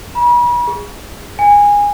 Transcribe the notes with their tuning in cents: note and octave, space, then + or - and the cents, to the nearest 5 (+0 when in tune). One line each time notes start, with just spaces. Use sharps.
B5 -40
G#4 -20
G#5 -20